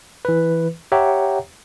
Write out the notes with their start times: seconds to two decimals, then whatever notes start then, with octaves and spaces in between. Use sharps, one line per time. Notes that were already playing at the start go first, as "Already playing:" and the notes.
0.25 E3 B4
0.92 G4 C#5 E5 F#5 G5 A#5